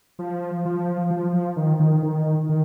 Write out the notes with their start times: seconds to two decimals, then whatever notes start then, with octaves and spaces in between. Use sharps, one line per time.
0.19 F3
0.65 F3
1.10 F3
1.33 F3
1.57 D#3
1.80 D#3
2.03 D#3
2.49 D#3